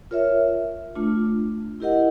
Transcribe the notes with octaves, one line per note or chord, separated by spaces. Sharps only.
F4 A#4 C#5 E5
A3 D4 F4
E4 G4 A#4 D#5 F#5